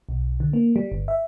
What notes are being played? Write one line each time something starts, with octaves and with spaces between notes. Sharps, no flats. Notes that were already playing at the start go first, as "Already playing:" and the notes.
B1
D3
A#3
G3
G1
E5